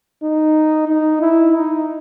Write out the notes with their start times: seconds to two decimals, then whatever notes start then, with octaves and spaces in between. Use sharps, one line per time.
0.23 D#4
0.88 D#4
1.21 E4
1.54 D#4